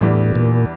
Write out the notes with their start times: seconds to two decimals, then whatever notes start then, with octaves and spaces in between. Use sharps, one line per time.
0.01 E2 A2 E3 G3 D4
0.35 A#2